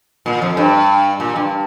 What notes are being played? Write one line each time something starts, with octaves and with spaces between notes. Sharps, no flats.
A#2
F2
G2
A#2
G2